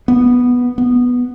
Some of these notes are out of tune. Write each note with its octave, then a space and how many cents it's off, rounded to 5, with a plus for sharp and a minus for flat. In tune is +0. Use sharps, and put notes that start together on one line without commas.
B3 -5
B3 -5